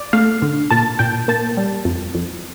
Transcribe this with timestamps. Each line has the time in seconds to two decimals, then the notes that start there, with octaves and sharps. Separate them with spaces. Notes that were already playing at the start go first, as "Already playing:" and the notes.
Already playing: D5
0.13 A3 F5
0.42 D3
0.70 A#2 A5
0.99 A#2 G5
1.28 A#3 A5
1.57 G3
1.85 F2
2.15 F2